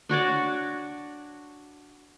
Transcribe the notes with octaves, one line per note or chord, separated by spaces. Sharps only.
D4 F#4 C#5 D5